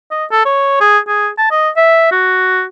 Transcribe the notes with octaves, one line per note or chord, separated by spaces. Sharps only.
D#5
A4
C#5
G#4
G#4
A5
D#5
E5
F#4